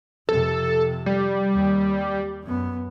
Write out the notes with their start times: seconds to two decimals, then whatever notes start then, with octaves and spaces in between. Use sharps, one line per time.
0.29 F2 C3 A4
1.06 G3
1.54 D#2
2.43 F#2 B3